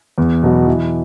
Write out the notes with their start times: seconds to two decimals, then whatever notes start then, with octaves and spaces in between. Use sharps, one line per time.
0.18 E2
0.43 B2 F#3 B3 F#4
0.67 E3